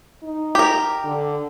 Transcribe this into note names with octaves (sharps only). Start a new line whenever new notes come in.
D#4
G4 A#4
D3